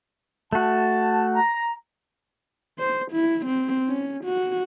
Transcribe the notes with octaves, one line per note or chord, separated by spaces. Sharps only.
A3 F#4 A5
A#5
C5
E4
C4
C#4
F#4